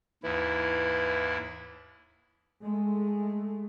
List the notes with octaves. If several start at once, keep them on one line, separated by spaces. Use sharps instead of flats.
D#2 G#2 E3 E4
G#3 A3